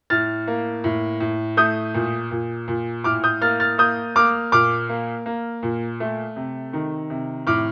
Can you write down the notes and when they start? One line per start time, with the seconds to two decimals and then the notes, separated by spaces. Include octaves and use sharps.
0.10 A2 F6 A6
0.47 A#3
0.84 A2
1.20 A2
1.57 A3 D#6 G6
1.94 A#2
2.31 A#2
2.68 A#2
3.04 A2 D6 F6
3.24 D#6 G6
3.42 A#3 F6 A6
3.60 F6 A6
3.78 A#3 D#6 G6
4.16 A#3 D6 F6
4.52 A#2 D6 F6
4.89 A#3
5.26 A#3
5.63 A#2
6.00 A3
6.36 C3
6.73 D#3
7.10 C3
7.47 A2 D6 F6